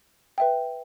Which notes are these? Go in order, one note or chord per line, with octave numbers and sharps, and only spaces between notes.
B4 E5 G5